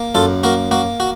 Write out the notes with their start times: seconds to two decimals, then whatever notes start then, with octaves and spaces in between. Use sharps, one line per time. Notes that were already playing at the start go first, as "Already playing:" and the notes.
Already playing: A#3
0.15 F#2 F4 A4
0.43 A#3 F#4 A#4
0.71 A#3 F#4
1.00 F#4